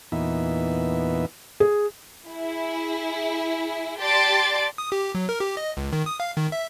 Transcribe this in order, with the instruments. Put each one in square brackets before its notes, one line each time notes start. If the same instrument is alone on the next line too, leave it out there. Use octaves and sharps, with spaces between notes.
[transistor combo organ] E2 A#2 E3 B3 D#4 E5
[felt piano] G#4
[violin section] E4 G#4
G4 D5 A5 C6 A6 D7
[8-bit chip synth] D#6
G4
F#3
A#4
G4
D#5
C#2
D#3
D#6
F5
D#3
E5